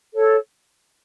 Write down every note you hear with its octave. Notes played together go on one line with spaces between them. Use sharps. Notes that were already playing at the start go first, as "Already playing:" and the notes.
A4 C#5